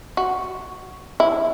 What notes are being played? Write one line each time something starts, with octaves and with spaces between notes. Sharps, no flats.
F#4
E4